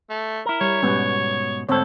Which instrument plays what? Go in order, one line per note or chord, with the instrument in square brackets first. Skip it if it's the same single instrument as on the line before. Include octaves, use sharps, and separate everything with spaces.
[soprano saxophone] A3
[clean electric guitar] E4 A#4
[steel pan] G3 [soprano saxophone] C#5
[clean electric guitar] G#2 B2 [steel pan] G3 B3 C#4
[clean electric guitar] D2 G#2 A4 [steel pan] C4 C#5